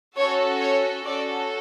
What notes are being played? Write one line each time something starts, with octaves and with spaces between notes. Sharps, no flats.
C#4 F#4 A4 C#5
C#5
C#4 F#4 A4 D5